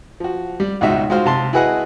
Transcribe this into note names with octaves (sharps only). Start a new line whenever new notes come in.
F3 F#4
G3
C#2 G#2 B2 D#4 F#4 E5
G#3 F4 F#4 C5 F6
C3 A5 C6
E4 F#4 G#4 B4 D#5 F#5